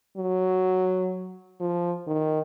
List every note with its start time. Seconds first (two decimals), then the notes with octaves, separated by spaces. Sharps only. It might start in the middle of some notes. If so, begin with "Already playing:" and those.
0.17 F#3
1.60 F3
2.07 D#3